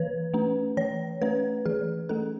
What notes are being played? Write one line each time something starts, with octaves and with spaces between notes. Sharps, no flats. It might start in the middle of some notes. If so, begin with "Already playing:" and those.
Already playing: E3 B4
A3 C#4
E3 C#5
A3 C#4 B4
E3 G#4
A3 C#4 A4